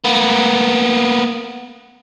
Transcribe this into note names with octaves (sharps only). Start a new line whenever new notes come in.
A#3 B3